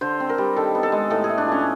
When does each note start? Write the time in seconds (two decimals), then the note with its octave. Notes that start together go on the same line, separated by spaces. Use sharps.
0.01 D3 C5
0.20 C4
0.29 A#4
0.38 G3
0.56 D#3 A4
0.75 B3
0.83 A4
0.92 G#3
1.10 A2 A4
1.24 G#4
1.29 A3
1.38 D4
1.47 F3 C#4